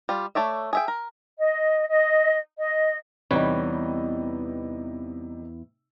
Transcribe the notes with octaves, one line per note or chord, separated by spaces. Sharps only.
G3 F4
A3 C#5 D5 E5
G#4 E5 G5
A#4
D#5
D#5
D#5
E2 C3 E3 G3 D#4 B4 C#5